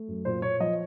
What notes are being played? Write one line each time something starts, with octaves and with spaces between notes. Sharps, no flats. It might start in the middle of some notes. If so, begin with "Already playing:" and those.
Already playing: A3
F#2
A#2 C5
A#2 C#5
F3 D#5